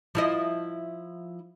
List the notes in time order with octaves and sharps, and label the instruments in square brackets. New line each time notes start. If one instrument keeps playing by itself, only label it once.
[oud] F3 E4 D#5